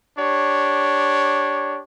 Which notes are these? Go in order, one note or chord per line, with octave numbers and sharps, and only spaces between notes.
D4 G4 C#5